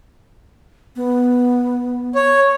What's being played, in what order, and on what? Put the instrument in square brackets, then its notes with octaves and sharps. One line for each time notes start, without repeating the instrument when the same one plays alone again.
[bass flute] B3
[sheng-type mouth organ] C#5